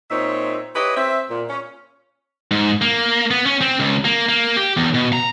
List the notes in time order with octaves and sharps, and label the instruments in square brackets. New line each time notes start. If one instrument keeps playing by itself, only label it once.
[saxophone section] A#2 C4 D#4 C#5 E5
E4 G4 B4 C#5 D#5
C4 E5
A#2
C#4
[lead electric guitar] G#2
A#3
B3
C#4
C4
C#2
A#3
A#3
G4
E2
B2
A#5